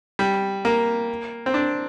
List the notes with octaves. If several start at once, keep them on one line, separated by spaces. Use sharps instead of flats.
G3
A#3
C4
D4